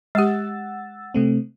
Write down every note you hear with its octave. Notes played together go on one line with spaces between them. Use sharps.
G#3 G4 F#5 E6 A6
C3 A3 C4